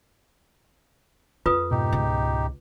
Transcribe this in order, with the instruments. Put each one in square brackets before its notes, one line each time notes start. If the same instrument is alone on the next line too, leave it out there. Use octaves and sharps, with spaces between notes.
[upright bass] F2 [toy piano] F4 B4 D#6
[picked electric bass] G#2 B2 [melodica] D#4 G4
[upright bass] C#2